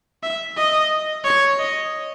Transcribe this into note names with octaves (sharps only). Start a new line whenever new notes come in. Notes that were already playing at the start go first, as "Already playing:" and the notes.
E5
D#5
C#5
D#5